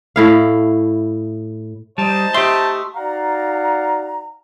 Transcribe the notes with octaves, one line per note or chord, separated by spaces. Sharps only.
A2 E4 F5
G3 D#4 C5 D#5 A5
A3 G4 C6
D#4 F#4 D5 F5 F#5 A#5